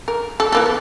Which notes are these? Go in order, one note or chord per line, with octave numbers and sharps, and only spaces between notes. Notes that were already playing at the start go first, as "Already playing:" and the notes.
A#4
A4
E3 A#3 A4
B3